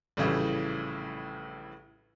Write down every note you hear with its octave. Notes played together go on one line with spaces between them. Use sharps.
A#1 A2 C#3 E3 G3 A3